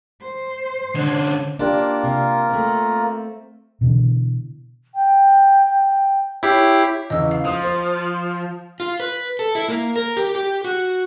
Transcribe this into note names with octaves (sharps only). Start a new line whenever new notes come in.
C5
D3 C#4
A#3 D4 F4 G4 A#4
C3
A3 C4
B2 D3 E3
G5
G5
E4 G4 C#5 C7
E2 C#3 D#5 E6
F5
F3 D#6
C5
F4
B4
A4
E4
A#3
A#4
G4
G4
F#4